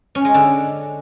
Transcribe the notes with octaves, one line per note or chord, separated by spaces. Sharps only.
C#4
G#3
D3